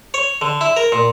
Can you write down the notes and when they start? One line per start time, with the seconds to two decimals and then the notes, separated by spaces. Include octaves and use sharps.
0.14 C#5
0.41 D3
0.61 E4
0.77 A#4
0.92 A#2